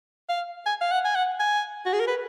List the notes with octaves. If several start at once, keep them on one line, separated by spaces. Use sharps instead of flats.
F5
G#5
F5
F#5
G#5
F#5
G#5
F#4
G#4
A#4
B4